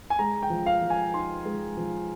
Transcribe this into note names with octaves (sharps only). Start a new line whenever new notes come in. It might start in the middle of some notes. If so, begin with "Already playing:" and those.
G#5
G#3 A#5
G5
F3
F5
F3
G#5
D#4 C6
G#3
F3